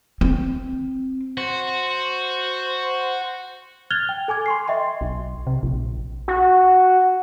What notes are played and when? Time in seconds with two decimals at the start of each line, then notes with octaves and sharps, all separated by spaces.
0.21 C4
1.37 F#4 C5
3.90 F6 F#6 G#6 A6 F7 G7
4.09 G5
4.28 A4 G#5 D6 G#6
4.46 C6 C#6 C7
4.68 D#5 E5 G5 C6
5.01 B1
5.47 C3
5.63 A#1
6.28 F#4